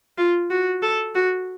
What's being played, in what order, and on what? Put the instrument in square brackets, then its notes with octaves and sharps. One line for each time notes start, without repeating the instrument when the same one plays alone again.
[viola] F4
F#4
A4
F#4